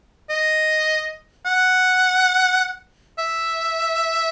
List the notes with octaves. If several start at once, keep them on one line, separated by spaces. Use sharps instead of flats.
D#5
F#5
E5